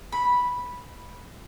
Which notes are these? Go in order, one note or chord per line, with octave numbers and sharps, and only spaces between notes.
B5